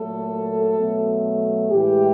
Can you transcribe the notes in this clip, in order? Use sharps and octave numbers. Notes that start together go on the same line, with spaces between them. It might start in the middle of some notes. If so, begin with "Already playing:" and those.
Already playing: A#2 F#3 A3 A4
B2 F#3 A3
A2 E3 G#3 G4